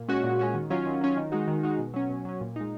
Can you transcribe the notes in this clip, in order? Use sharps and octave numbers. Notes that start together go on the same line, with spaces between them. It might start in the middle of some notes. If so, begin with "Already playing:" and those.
Already playing: A#2
G#3 C#4 F#4
A#2
G#3 C#4 F#4
D#3
F#3 C#4 F4
D#3
F#3 C#4 F4
D#3
G#3 D#4 F#4
D#3
G#3 D#4 F#4
B2
F#3 C#4
B2
F#3 C#4
A#2
G#3 D#4